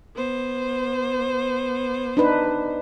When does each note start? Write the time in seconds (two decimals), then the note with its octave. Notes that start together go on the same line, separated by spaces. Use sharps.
0.15 B3 C5
2.17 D4 D#4 B4